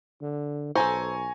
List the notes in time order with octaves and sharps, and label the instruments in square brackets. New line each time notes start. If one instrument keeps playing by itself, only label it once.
[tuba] D3
[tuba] B1 [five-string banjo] A4 C5 [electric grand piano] G#5 A#5 C#6